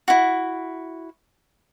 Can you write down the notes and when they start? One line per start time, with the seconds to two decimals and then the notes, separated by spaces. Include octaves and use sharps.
0.08 E4 F#4